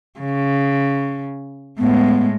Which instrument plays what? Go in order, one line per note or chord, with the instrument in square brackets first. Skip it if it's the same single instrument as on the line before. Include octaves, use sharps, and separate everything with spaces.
[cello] C#3
[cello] A2 G#3 [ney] B3